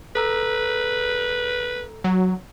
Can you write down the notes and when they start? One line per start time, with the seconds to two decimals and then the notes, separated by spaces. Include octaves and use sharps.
0.15 A4 B4 A#5 E6
2.04 F#3